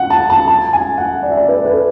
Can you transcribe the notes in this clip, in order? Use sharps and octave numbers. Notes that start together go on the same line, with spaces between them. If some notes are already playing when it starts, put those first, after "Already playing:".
Already playing: F#5
A5
A5
A5
G#5
F#5
D5
E5
D5
B4
A4
B4
A4